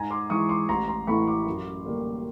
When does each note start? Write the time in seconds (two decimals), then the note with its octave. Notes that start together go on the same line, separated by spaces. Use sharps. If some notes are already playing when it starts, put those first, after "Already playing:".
Already playing: G#2 G#5 A#5
0.11 C6 D6
0.30 E3 G#3 C#6 D#6
0.49 C6 D6
0.69 A1 A#5 C6
0.88 A#5 C6
1.07 A2 E3 A3 B5 C#6
1.27 C6 D6
1.46 F#2
1.85 D3 G3 A#3